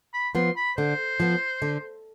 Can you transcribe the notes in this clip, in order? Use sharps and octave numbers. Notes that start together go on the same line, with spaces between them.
B5
F3 B3 C6
B5
D3 C5
F3 B3
D3